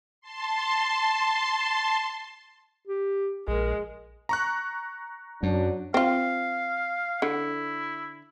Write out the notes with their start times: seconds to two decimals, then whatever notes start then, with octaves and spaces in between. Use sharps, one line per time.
0.21 A5 C6
2.87 G4
3.48 A#1 G#3 A#4
4.29 A#5 C#6 F#6
5.43 F#2 F#3 D4
5.94 C4 F4 F5
7.22 D3 E4